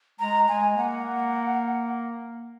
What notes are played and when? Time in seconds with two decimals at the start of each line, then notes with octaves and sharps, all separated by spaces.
0.20 G#3 A#5
0.48 G#3 G#5
0.77 A#3 F#5